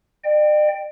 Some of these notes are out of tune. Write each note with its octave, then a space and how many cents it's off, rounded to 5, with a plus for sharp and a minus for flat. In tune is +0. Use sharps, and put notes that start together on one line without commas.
D5 +45 G5 +0